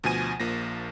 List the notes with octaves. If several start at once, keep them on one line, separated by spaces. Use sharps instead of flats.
D2 B2 F3 G#5 D#7
A#1 F3 A#3 A#6